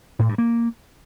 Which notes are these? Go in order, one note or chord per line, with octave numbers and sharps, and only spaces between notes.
A2
G2
A#3